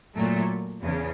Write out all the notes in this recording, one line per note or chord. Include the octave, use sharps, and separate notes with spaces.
A#2 F#3 A3
E2 C#3